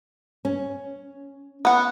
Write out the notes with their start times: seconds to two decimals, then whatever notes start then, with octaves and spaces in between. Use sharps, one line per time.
0.45 C#4
1.65 B3 F#5